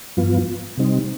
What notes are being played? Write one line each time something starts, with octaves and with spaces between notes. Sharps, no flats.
G2 F3 B3 F4
C3 G3 C4 D#4